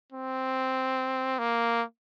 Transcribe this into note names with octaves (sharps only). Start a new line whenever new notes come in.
C4
A#3